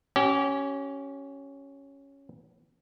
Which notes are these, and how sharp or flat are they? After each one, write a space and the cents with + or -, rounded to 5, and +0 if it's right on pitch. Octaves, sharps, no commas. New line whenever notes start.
C#4 +0 G4 -30